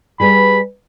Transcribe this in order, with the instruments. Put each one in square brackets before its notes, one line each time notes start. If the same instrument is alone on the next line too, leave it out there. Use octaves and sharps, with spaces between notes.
[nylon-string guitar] G3 G#4 B4 [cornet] B5